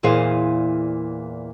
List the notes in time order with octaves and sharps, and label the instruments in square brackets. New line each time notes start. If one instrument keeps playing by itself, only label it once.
[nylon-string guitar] E2 A#2 E3 G#4 C5 F5